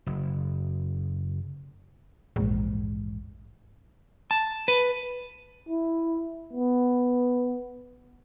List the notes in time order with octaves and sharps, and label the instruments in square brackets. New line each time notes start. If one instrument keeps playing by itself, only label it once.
[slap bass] F#1
[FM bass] A#1 [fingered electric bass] E2 G#2 G#3
[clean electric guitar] A5
B4
[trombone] E4
B3